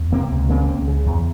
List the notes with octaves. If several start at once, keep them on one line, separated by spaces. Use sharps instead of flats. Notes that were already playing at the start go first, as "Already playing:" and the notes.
Already playing: E2
C3 A#3 C4
C#2
C#3 A#3 C4
C#2
C#3
E2